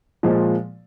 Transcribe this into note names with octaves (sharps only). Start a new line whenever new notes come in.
A#2 F3 G#3